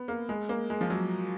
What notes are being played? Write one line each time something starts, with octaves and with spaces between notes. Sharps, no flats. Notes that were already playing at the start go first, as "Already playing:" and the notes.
Already playing: B3
A#3
G#3
A#3
G#3
F3
F#3